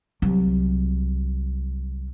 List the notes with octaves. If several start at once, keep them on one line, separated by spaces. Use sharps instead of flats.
C2 F#3